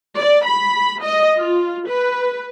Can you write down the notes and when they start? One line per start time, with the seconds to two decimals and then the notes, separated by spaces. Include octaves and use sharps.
0.16 D5
0.47 B5
1.03 D#5
1.37 F4
1.88 B4